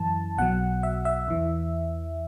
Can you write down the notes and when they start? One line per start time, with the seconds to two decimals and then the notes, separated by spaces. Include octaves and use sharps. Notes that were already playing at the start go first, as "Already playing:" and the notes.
Already playing: F#2 E3 A5
0.38 B1 B2 F#3 F#5
0.83 E5
1.05 E5
1.28 E2 E3